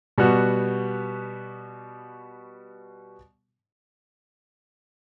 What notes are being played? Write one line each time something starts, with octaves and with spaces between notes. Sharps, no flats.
B2 G3 B3 F#4